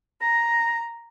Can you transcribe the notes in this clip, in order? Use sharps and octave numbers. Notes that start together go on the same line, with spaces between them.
A#5 A#6